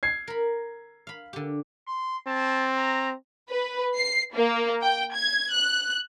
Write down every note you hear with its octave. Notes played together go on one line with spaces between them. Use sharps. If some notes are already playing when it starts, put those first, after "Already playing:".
G#6 C7
A#4 B5
F5 B5
D3 G4
C6
C4 A5
A#5
B4
C7
A#3
G5
G#6
F#6